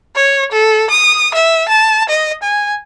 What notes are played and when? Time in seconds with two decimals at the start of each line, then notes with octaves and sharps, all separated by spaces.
0.16 C#5
0.52 A4
0.90 D#6
1.34 E5
1.69 A5
2.09 D#5
2.43 G#5